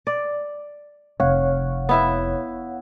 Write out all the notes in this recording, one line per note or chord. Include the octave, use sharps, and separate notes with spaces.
D5
F1 C#5 F5 F#5
B3 E4 E5